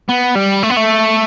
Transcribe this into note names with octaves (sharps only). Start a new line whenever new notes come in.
B3
G3
A3
B3
A3